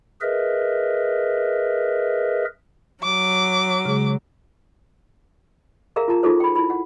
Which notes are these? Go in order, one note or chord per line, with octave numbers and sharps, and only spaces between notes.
G#4 A#4 B4 D#5 E5
F#3 D6
C#3 G#3 G#4
G#4 A#4 E5 F5 A#5
F4 A#4 A5 A#5
D#4 F4 F#4 G#4 A4 C5
G5 B5
E4 B5
F#5